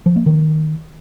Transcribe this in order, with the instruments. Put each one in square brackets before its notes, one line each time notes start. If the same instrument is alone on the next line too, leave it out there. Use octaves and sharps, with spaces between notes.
[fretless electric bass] F3
A#3
D#3